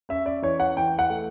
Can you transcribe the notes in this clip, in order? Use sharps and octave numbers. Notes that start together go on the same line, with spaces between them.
C#4 E5
D5
E3 C#5
F#5
E3 G5
F#5
A3